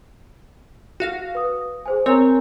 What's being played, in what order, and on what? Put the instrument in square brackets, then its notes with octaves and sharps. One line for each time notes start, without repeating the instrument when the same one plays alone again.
[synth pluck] F#4 F5 A#6
[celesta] B4 D#6
G#4 C5 G#5
[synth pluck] C4 C#5 [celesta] A#4 G#5 A#5